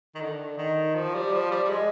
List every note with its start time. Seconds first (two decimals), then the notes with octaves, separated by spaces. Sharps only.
0.15 D#3
0.21 D3
0.58 D#3
0.95 F3
1.14 G3
1.32 F3
1.51 G3
1.64 G3
1.70 G#3